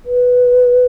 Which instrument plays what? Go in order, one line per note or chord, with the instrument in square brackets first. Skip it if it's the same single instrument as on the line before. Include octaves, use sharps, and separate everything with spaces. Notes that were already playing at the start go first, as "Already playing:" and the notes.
[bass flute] B4